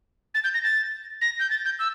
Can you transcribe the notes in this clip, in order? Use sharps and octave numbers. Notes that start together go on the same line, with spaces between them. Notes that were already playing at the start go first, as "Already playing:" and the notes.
A6
G6
A#6
A6
A#6
G6
A6
G6
E6